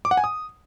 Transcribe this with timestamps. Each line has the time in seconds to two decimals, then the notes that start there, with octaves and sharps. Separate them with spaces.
0.05 D6
0.11 F#5
0.17 G#5
0.24 D#6